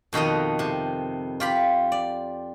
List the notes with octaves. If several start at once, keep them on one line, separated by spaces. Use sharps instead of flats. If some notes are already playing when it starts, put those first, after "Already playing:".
F2 B2 D#3 A4 D#5
C3
F4 G4 B5
D5